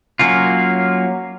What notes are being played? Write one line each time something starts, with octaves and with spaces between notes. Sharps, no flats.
F#3 A#3 C#4 F4